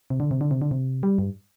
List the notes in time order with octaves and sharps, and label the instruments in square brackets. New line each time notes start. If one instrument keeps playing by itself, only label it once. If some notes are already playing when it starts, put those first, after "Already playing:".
[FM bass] C3
D3
C3
D3
C3
D3
C3
G3
G2